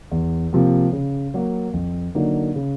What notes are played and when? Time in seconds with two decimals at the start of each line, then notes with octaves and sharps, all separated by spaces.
0.11 E2
0.53 C3 F3 A#3
0.93 C#3
1.34 F#3 A#3
1.73 F2
2.15 D3 F#3 A#3 D#4
2.56 C#3